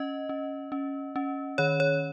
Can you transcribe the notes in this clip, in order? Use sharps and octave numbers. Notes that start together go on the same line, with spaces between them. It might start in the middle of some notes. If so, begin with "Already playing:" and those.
Already playing: C#4 D#5
C#4
C#4
C#4
D#3 C#5
C#5